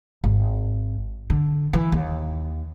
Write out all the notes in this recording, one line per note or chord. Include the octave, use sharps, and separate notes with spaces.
G#1
D3
E3
D#2